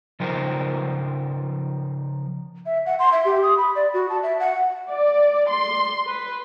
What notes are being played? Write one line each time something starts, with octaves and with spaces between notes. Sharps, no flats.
C#3 F3 D#4 A#4 C5
E5
F#5
C6
E5
G4
D#6
B5
D5
F#4
A5
E5
F#5
D5
C6
B4